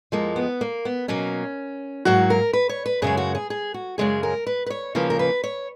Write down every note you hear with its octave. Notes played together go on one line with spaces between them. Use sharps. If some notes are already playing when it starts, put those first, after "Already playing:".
F2 F3 G#3 A#3
B3
A#3
B3
B2 F#3 A#3 C#4
G#2 F#3 A#3 F#4
A#4
B4
C#5
B4
F#2 C#3 G#3 G#4
F#4
G#4
G#4
F#4
F#2 C#3 G#3 G#4
A#4
B4
B4
C#5
D#2 C#3 F3 A#3 B4
A#4
B4
C#5